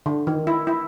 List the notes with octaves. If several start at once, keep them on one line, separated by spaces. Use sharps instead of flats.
D3
D#3
E4
E4